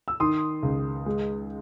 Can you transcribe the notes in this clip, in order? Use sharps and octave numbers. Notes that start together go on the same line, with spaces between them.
E6
D#3 C6 D#6
C#2
G#3